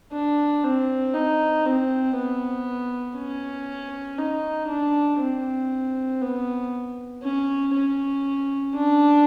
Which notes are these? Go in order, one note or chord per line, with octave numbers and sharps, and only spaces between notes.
D4
C4
D#4
C4
B3
C#4
D#4
D4
C4
B3
C#4
C#4
D4